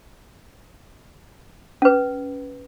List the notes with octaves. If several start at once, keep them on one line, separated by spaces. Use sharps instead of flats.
C#4 B4